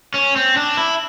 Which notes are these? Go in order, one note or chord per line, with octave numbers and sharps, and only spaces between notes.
C#4
C4
D4
E4